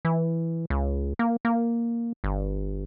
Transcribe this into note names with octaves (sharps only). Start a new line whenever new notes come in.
E3
C#2
A#3
A#3
G1